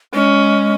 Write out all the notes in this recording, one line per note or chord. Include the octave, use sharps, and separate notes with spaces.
G#3 C#4